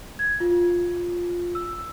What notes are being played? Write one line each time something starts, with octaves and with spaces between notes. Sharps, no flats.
G#6
F4
E6